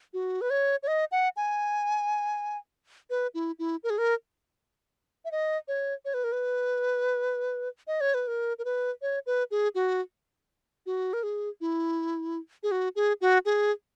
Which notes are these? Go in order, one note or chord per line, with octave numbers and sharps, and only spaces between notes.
F#4
B4
C#5
C#5
D#5
F#5
G#5
B4
E4
E4
A#4
G#4
A#4
E5
D#5
C#5
C#5
B4
A#4
B4
D#5
C#5
B4
A#4
A#4
B4
C#5
B4
G#4
F#4
F#4
A#4
G#4
E4
G#4
F#4
G#4
F#4
G#4